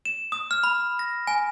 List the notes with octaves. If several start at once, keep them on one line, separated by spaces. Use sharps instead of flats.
E7
D#6
F6
B5
A#6
G#5